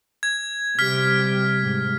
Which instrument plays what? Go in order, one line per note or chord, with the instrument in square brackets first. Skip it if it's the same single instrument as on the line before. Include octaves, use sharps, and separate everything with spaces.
[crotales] G#6
[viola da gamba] C3 G3 G4 [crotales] F6 B6
[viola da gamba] G#2